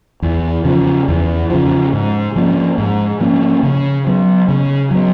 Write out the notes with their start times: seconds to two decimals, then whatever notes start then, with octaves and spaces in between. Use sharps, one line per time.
0.22 E2
0.65 C#3 F3
1.08 E2
1.50 C#3 F3
1.93 G#2
2.36 F3 A#3 C#4
2.78 G#2
3.20 F3 A#3 C#4
3.63 C#3
4.07 F#3 B3
4.48 C#3
4.91 F#3 B3